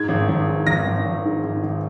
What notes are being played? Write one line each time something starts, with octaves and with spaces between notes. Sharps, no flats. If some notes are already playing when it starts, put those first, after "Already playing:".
Already playing: G#2 G#6
G#1
G#1
G#2
G#1 A#6
G#1
G#1
G#2
G#1
G#1